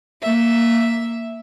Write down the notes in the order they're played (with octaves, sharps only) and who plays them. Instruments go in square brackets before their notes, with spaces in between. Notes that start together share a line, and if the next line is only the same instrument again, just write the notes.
[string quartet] A#3 E5